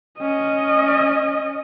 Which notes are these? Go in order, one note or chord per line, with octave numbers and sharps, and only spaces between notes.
C#4 D#5